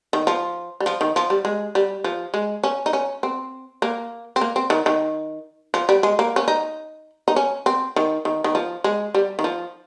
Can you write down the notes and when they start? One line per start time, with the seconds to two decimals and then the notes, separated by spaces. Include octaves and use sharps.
0.13 D#3
0.27 F3
0.80 G3
0.86 F3
1.01 D#3
1.16 F3
1.30 G3
1.45 G#3
1.75 G3
2.04 F3
2.34 G#3
2.64 C#4
2.86 D#4
2.93 C#4
3.23 C4
3.82 A#3
4.36 C4
4.41 A#3
4.56 C4
4.70 D#3
4.86 D#3
5.74 F3
5.89 G3
6.03 G#3
6.19 A#3
6.36 C#4
6.48 D#4
7.28 D#4
7.36 C#4
7.66 C4
7.96 D#3
8.25 D#3
8.44 D#3
8.55 F3
8.84 G#3
9.15 G3
9.39 D#3
9.44 F3